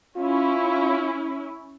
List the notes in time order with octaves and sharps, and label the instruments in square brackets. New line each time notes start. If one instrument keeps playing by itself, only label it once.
[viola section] C#4 E4 [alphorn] F4